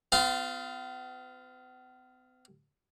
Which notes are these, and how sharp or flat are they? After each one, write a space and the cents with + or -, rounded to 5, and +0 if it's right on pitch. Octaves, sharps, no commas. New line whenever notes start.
B3 +45 F4 +0